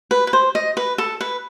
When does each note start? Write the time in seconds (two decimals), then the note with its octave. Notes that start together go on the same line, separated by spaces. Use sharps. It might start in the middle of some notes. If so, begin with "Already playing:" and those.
0.11 B4
0.27 B4
0.33 C5
0.55 D#5
0.77 B4
0.98 A4
1.21 B4